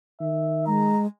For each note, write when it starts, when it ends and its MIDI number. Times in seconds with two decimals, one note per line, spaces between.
0.21 0.94 51
0.21 0.63 76
0.67 1.06 56
0.67 1.01 82